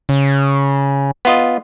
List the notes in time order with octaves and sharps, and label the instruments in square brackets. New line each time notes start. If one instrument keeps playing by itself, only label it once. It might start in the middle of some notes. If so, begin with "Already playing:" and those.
[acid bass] C#3
[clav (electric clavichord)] B3 F4 D#5